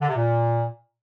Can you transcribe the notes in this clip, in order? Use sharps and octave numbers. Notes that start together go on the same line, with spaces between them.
D3
C3
A#2